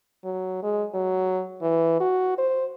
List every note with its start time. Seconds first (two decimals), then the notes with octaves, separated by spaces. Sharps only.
0.24 F#3
0.63 G#3
0.94 F#3
1.62 E3
2.00 F#4
2.38 C5